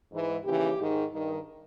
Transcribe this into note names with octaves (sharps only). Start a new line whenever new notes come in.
G#2 E3
D#2 C#3 E3 G4
G#2
D#3
G2 D#3